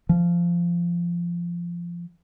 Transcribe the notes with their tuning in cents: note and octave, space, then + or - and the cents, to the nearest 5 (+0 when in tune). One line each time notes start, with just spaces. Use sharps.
F3 -15